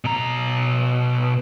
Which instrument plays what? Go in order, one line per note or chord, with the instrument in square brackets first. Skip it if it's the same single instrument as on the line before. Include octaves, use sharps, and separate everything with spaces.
[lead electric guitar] B2 A#5